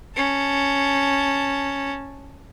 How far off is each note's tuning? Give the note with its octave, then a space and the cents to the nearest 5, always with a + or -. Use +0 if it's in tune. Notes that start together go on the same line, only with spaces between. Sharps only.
C#4 +0 A5 +0